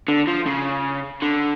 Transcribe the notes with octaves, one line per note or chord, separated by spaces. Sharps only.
D3
F3
C#3
D3